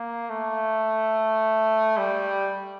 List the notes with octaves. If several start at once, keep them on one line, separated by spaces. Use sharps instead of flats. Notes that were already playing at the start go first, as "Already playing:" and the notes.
Already playing: A#3
A3
G3